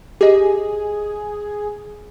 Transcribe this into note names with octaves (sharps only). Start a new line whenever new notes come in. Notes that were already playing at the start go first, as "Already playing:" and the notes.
G4 G#4 D#5